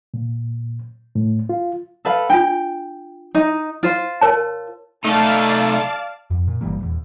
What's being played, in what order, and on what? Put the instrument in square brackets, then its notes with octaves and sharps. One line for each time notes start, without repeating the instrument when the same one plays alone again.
[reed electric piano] A#2
A2
F4
[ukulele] A4 B4 F5
[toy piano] D4 F4 [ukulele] G5
[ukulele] D#4 D#5
F4 C5
[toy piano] A#4 C#5 A5
[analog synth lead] A3 [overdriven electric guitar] D#4 A4 [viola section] D5 F5 A5
[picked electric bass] F2
A#2
G1 E3 G3 A#3
D#1 E2